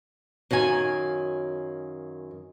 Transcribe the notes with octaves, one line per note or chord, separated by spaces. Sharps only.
F#2 D#3 F5 G#5